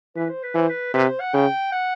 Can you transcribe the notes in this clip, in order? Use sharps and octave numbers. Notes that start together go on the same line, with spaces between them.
E3 B4
C5
B4
E3 C5
B4
C3 B4
C5
F#5
C#3 G5
F#5